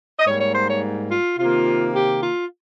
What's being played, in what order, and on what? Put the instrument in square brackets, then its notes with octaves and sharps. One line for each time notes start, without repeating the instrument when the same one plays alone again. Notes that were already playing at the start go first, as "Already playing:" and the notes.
[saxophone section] D#5
G#2 G3 A#3 C#5
C#5
C5
C#5
F4
C3 D#3 A#3 F4
G4
F4